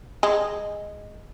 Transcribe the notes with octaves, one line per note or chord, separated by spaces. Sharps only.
G#3